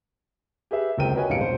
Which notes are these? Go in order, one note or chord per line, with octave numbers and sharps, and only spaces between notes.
G4 G#4 B4 E5
F#1 C#2 C4 A#4 G5 D#7
F#4 A#4 B4 C#5 D#5 G#5
A1 G2 C3 F5 C#7 D7
E1 A#1 C5